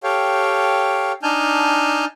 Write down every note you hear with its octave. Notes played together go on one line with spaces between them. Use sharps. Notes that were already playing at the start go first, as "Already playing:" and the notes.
G4 A4 C#5 F5 G5
D4 D#4 G#5 A5 F6 G6